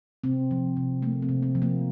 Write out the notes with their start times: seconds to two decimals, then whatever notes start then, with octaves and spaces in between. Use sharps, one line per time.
0.24 C3 C4
0.51 F3
0.77 C3
1.02 A3 A#3
1.22 C4
1.29 C3
1.43 C4
1.55 F3
1.62 A#3